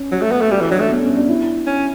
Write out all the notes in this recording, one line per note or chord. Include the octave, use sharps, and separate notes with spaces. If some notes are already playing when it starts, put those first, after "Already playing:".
Already playing: C#4
F#3 F#4
A3
B3
A3
G3 F#4
E3
F#3 D4
A3
B3
C#4
D4
E4
C#4